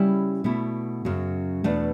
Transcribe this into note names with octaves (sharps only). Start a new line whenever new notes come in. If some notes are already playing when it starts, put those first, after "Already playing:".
Already playing: C#3 G3 C#4 E4
B2 A3 E4
F#2 C#3 F#3
E2 B2 A3 D4